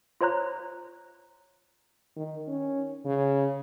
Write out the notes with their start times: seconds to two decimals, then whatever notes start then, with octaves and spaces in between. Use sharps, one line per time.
0.21 F4 C5 C#5 A#5 F#6
2.17 D#3
2.48 C#4
3.05 C#3